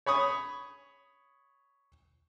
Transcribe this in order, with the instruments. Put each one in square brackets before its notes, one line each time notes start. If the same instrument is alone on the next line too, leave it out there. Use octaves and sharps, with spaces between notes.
[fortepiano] C#5 B5 C#6 D#6